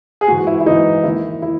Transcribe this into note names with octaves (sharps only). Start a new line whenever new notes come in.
G#4
G#2 E3 F#4
F#4
E4
E4
G#2 E3 D#4
D#2 D#3 E4
E4